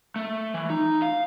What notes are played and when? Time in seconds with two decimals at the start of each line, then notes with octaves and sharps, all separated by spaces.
0.16 A3
0.54 E3
0.70 D#4
1.02 F5